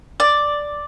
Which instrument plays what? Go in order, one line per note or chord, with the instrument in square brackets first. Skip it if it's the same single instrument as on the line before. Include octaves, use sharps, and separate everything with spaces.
[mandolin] D5